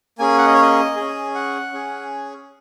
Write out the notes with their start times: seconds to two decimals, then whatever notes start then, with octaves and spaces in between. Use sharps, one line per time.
0.19 A#3 C#4 G#4 G#5
0.38 F#5
0.46 D#5
0.54 C#5
0.62 D#5
0.96 C#4 G#4
1.35 F#5
1.72 C#4 G#4